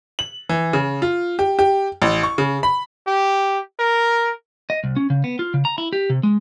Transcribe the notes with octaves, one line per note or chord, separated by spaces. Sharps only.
F#7
E3
C#3
F4
G4
G4
A1
C#6
C#3
B5
G4
A#4
D#5
C2
C#4
C#3
B3
F4
C#3
A#5
E4
G4
C3
G#3